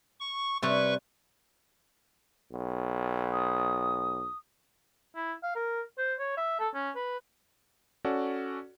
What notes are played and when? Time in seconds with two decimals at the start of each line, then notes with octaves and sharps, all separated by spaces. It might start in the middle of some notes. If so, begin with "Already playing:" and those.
0.20 C#6
0.62 C3 G3 B4 C#5 C#6
2.52 B1
3.32 D#6
5.15 E4
5.43 F5
5.56 A#4
5.98 C5
6.19 C#5
6.37 E5
6.59 A4
6.74 C#4
6.96 B4
8.05 C#4 F#4 A4 D5